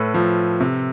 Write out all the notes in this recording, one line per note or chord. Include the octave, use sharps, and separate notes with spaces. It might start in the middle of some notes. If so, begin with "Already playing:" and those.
Already playing: A2 A4 B4
F3
C3